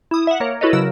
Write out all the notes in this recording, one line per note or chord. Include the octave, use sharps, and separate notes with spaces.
E4 D#6
E5 F#5
A#3 A#4 C#5
E4 F#4 A4 B4 C#5 D#5
C#3 F#3 A#4 E6 E7